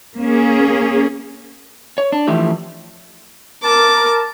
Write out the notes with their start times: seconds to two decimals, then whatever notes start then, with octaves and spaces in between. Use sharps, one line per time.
0.18 A#3 C#4 G#4
1.98 C#5
2.12 D4
2.28 E3 F3 A3 E4 G4
3.63 A#4 A5 D6